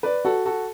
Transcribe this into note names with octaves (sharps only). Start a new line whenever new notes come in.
B4 D5
F#4 A4
F#4 A4